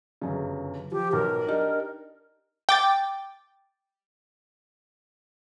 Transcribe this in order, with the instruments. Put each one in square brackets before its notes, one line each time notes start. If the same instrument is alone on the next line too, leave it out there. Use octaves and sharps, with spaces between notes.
[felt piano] G1 F#2 C#3
[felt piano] F3 [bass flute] G4
[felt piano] B1 [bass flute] A#4
[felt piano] D4 D#4 G4
[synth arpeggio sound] G5 D6 A6